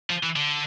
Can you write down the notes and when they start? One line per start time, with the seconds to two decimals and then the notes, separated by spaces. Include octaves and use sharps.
0.10 F3
0.23 E3
0.36 D3